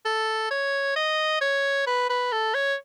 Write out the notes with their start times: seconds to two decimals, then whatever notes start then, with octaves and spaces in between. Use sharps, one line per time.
0.05 A4
0.51 C#5
0.96 D#5
1.41 C#5
1.87 B4
2.10 B4
2.32 A4
2.54 C#5